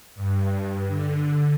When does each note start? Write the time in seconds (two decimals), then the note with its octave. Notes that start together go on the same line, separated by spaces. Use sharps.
0.15 G2
0.87 D3